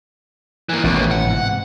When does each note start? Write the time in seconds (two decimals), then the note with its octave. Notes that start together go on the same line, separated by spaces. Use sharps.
0.69 E3 A#3
0.84 A1 D#2 B2
1.11 F#5
1.27 G#2 C3